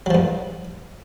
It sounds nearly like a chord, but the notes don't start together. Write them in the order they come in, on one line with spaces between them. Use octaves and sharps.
F#3 F3 G2